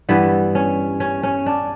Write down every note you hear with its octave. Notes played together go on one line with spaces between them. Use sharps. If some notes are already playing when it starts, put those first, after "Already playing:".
G2 E3 G3 B3
C#4
C#4
C#4
D4